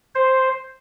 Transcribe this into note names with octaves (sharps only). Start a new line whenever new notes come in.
C5